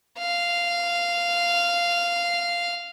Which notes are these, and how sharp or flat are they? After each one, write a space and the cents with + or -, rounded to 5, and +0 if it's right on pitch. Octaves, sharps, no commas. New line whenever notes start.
F5 -10